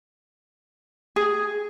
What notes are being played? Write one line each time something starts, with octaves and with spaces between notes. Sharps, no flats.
G#4